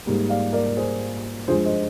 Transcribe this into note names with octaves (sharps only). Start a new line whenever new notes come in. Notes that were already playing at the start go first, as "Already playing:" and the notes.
G#2 G3 A#3
D5 F5
A#4 D5
A#4
G#4 C5
G2 F3 G#3 G#4 C5
C5 D#5